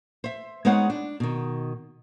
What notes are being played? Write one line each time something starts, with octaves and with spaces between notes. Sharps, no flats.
C5 E5
G#3 B3 D#4 C5 C#5 F#5
D4
B2 D#3